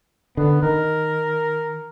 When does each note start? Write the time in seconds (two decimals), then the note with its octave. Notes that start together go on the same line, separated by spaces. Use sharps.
0.37 D3 B3
0.63 D#3 A#4